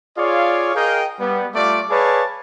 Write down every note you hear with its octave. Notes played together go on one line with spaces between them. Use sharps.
F4 G#4 C#5 D5 F5
G#4 A#4 D#5 F5 G5
G3 B3
G3 A3 F4 D5
G#4 B4 C#5 D5 F5 A5